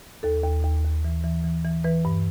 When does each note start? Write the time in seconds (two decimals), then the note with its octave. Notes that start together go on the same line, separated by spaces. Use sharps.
0.23 D#2 A4
0.44 D#2
0.64 D#2
0.84 D#2
1.05 E3
1.24 E3
1.44 E3
1.65 E3
1.84 E3 B4
2.05 G2